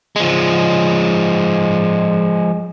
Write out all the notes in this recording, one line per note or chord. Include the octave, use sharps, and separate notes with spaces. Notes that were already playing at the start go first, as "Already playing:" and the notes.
F3 G#3